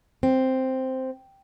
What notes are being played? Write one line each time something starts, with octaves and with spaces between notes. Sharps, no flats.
C4